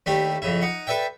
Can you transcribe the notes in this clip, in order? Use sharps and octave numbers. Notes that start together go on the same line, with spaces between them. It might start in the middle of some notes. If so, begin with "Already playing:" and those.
D#2 A3 D4 G4 B5
F2 C#3 E4
D#4 F#5
A4 B4 D5 E5 G5